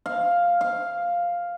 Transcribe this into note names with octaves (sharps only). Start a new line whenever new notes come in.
F5
F5